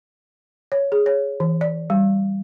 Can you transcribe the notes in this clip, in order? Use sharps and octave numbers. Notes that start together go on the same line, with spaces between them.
C#5
G#4
C#5
E3
D5
G3